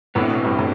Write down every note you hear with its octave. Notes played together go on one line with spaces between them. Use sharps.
A2 C3 E3 B3
B2
G2
A2